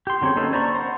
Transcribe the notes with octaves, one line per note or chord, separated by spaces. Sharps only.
G4 C6
D3 F#3 C4 G#4 C#5
A#3 C#4 D#4 A4 B4
C5 D5 A#5 B5 C#6
C5 F#5